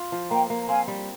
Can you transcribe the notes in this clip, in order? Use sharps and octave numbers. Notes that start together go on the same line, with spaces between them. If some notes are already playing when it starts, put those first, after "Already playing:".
Already playing: F4
F3
A#3 G5 A#5
A#3
A#5
C4 F5 G#5
G3